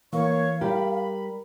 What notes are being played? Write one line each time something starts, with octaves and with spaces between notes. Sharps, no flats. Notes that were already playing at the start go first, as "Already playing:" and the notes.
E3 A#3 C#5 F5 C#6
G3 G4 A#4 B5